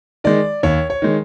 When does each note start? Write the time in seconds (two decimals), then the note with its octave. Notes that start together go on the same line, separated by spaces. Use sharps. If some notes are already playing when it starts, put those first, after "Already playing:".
0.24 D#3 G#3 D5
0.63 D#2 C#5
0.90 C#5
1.02 D#3 G#3